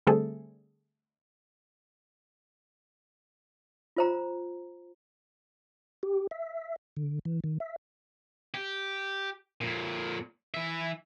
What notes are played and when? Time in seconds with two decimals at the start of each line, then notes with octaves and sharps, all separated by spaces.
0.07 D3 G3 A3 C4 G#4 A4
3.97 F4 C5 A#5
6.03 G4
6.31 E5
6.97 D3
7.25 E3
7.44 D#3
7.60 E5
8.54 G4
9.61 F2 A#2
10.54 E3 E5